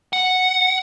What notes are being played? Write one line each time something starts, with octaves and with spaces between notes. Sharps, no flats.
F#5